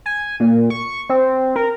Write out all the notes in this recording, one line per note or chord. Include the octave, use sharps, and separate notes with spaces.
G#5
A#2
C#6
C4
A#4